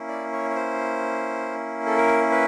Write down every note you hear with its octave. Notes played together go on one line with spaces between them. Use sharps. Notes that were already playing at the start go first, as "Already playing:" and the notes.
Already playing: A#3 C#4 E4
D5
C#5
C#5
C5
A4
A#4
B4